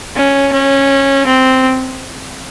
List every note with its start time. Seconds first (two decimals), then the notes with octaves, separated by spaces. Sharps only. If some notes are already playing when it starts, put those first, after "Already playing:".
0.16 C#4
0.53 C#4
1.27 C4